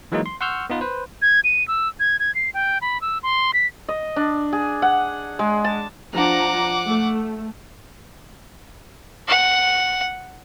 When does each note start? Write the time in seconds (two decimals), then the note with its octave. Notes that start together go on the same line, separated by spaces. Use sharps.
0.12 E3 F#3 G#3 A#3 D#4
0.26 C6
0.41 F#5 C6 C#6 E6 F6 G6
0.70 B3 D#4 F4 B4
0.81 B4 C5
1.22 G#6
1.44 D#7
1.68 E6
2.00 G#6
2.20 G#6
2.35 C7
2.54 G5
2.81 B5
3.01 E6
3.23 C6
3.54 B6
3.88 D#5
4.16 D4
4.53 G#4
4.82 F#5
5.39 G#3
5.64 A5
6.14 F3 D4 F#5 A#5 D6
6.88 A3
9.28 F#5